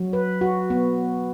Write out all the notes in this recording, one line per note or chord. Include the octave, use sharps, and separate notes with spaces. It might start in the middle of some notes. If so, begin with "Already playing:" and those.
Already playing: F#3
B4
F#4
B3